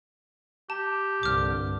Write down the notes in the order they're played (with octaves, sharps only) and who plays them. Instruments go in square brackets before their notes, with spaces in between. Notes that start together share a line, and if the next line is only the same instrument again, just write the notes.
[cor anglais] G4 [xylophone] A5
[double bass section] C2 G2 D3 [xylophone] D6 F6